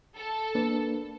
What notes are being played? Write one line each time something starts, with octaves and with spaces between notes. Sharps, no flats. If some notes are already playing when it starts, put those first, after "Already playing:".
A4
A#3 D4 B4